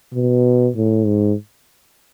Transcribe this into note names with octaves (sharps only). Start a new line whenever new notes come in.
B2
A2
G#2